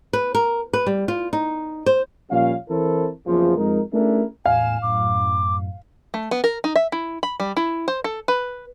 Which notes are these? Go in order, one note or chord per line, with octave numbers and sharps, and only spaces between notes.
B4
A#4
B4
G3
F4
D#4
C5
A#2 F3 G3 C#4 F5
E3 C4 E4 A4 A#4 C5
F#1 E2 F3
F2 G#3 D#4 A#4
A3 C#4 D4 E4 G#4 A#4
E2 A2 F5 G#5 E7
F#2 A2 D6
A3
B3
A#4
D#4
E5
E4
B5
G3
E4
C5
A4
B4